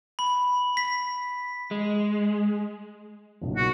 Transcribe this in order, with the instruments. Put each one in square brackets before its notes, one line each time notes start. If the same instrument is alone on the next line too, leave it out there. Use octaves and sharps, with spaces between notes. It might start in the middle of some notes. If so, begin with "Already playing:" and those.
[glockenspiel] B5
B6
[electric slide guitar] G#3
[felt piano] F#1 B1 A#2
[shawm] F#4